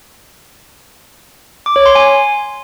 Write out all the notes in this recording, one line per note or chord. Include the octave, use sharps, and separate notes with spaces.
D6
C#5
C6
G#5